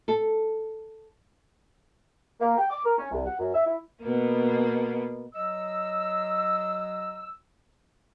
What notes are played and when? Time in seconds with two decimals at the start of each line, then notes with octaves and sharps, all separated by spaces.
0.08 A4
2.40 A#3
2.58 G5
2.70 D6
2.85 A#4
2.98 C#4
3.11 C2
3.25 F#5
3.39 F#2
3.53 E5
3.65 E4
4.01 B2 A#3 B3
5.34 F#3 D#5 E6